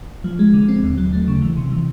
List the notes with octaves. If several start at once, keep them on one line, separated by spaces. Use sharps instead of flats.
F3
G#3
D3
C4
D#2
F#3
A3
C#3
E3
C3
E3